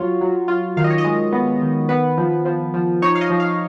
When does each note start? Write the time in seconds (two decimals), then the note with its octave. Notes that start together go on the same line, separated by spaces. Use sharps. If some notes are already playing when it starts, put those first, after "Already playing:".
Already playing: F#3 F4 C#5
0.21 F#3
0.48 F4
0.77 D#3 F5
0.84 D#5
0.90 C#5
0.98 D#5
1.04 G#3
1.32 B3
1.62 D#3
1.89 B3 B4
2.17 F3
2.45 F3
2.74 F3
3.02 D#4 C#5
3.15 F5
3.21 D#5
3.30 F3
3.40 F5